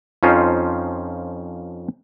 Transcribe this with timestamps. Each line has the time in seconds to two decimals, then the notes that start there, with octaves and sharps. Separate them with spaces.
0.23 F2 F3 C#4 D#4 F4 C5